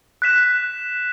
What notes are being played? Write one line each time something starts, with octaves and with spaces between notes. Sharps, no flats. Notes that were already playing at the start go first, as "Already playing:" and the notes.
F#6 B6 E7